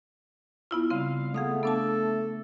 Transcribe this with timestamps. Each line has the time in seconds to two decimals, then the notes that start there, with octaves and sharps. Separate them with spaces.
0.71 B3 E4 F4
0.90 C#3 G3 C4 F5
1.34 A3 B3 G#4 F5 D#6
1.63 B3 D4 A4 A5